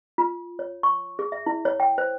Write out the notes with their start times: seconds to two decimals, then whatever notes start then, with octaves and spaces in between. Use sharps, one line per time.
0.18 F4
0.59 C#5
0.83 C#6
1.19 G#4
1.32 E5
1.46 E4
1.65 C#5
1.80 G5
1.98 C5